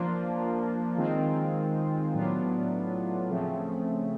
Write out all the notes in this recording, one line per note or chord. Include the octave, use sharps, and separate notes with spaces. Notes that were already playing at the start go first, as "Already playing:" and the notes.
Already playing: F3 A#3 D4 F4
D#3 G#3 C4 F4
A2 F#3 B3 D4 F4
C#3 F3 A3 C4